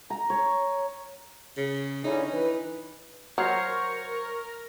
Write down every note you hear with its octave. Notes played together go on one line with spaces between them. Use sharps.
A#5
C#5
C#3
D3 E3 C#4 D#4
E3 B4
F#3 A#4 C5 C#5 F5 C#6